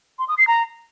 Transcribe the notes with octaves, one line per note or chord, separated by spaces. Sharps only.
C6
D#6
C7
A#5